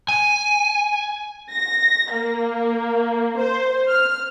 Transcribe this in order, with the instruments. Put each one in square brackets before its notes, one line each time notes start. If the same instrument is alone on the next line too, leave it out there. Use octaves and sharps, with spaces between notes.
[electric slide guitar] G#5
[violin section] A#6
A#3
C5
F6